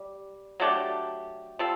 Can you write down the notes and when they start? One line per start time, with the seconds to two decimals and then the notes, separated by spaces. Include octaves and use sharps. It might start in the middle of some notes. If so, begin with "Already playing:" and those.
Already playing: G3
0.60 F#3 A3 D4 G4
1.59 G3 C4 F4 A4